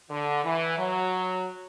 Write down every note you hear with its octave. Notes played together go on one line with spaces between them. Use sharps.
D3
E3
F#3